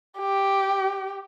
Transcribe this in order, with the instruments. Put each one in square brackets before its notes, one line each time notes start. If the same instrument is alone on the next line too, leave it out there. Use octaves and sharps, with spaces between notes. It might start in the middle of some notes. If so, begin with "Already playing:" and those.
[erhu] G4